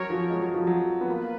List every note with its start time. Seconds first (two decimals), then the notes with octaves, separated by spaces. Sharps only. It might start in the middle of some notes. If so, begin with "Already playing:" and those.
Already playing: F#3 C#4 F#4 A#4 C#5
0.10 F3
0.30 G#3
0.42 F#3
0.54 F3
0.67 F#3
1.01 B3
1.08 A#3 F4 B4